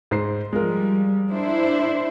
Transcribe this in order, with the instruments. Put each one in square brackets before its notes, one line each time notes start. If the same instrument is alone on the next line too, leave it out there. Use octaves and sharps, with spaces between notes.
[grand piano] G#2 C5 C7
[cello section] F3 G3 [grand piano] G#3 F4 A#4
[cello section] D4 E4 C5